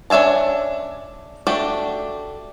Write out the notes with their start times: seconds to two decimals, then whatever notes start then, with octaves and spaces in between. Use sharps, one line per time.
0.10 C#4 D4 E5 G#5 A5
1.47 A3 D4 F#4 G4